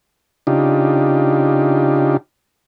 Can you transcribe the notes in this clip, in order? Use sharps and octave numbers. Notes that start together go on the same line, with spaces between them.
C#3 D4 D#4 F4 G4